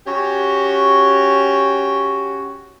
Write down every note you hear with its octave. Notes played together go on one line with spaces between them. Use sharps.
C#4 F#4 G4